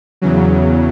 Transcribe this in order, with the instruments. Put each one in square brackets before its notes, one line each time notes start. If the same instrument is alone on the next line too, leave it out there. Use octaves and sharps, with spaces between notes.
[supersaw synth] E2 C#3 F#3